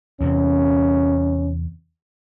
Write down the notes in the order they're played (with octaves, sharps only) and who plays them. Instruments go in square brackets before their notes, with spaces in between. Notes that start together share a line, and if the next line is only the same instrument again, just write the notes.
[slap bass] E2 C3 [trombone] C#4